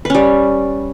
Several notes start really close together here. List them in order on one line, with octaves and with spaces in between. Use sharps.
B4 C#4 G3